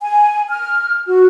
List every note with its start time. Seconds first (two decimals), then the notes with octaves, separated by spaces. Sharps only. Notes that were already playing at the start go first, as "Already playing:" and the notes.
0.01 G#5
0.50 F6
1.07 F#4